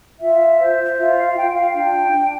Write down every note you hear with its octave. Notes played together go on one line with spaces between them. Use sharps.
F4 E5
C5
F4 E5
F5
F4 G5
G5
F5
D4 G5
D4